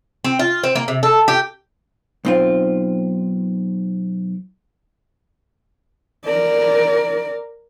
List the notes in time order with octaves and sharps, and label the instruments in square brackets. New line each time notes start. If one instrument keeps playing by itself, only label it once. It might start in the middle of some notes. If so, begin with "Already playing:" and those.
[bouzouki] C4
F4
C4
A#3
C3
A4
G4
[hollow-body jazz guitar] B1 C4 F4
[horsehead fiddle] A#4 D5